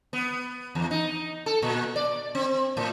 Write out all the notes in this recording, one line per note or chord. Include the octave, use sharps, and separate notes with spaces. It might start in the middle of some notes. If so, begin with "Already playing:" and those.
B3
E2
D#4
A4
A#2
D5
C4
A2